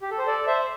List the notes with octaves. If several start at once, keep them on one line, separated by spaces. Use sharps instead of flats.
G4
A4
C5
A4 D5
C5 E5